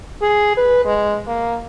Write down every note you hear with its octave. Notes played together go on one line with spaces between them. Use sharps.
G#4
B4
G#3
A#3